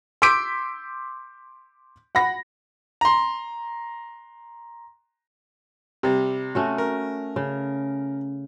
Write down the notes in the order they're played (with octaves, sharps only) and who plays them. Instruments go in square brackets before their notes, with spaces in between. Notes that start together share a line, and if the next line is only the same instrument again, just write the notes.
[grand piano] C6 D6 E6 G6 B6 D7
F#5 B5 A#6
A#5 C6
[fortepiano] C3 G3
[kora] A3 C#4 F#4
[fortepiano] A#4
[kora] C#3